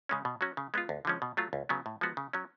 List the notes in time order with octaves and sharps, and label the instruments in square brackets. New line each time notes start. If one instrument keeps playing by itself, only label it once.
[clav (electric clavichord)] C#3 G#3 C#4
B2
F#3 C#4 F#4
C#3
G#3 B3 F4
D2
D3 F3 G#3 C#4
B2
F#3 A3 F4
C#2
C#3 F#3 B3
A2
F3 G#3 B3 F#4
C#3
F#3 C#4